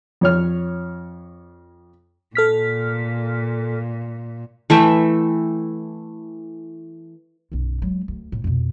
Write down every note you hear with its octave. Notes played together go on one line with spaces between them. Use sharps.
F2 C#5 F6
A#2 A4 F6 B6
E3 A3 E5 G5
B1 F#2
F#3 G#3
D2
A2
F2 B2